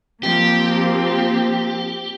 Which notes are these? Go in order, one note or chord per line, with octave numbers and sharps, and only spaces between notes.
F3 A#3 C4 G4